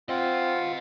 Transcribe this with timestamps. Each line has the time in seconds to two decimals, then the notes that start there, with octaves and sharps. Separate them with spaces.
0.09 C4 F4 D#5 F#5